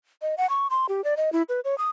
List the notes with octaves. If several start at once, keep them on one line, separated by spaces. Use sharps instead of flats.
D#5
F#5
C#6
C6
G4
D5
D#5
E4
B4
C#5
D#6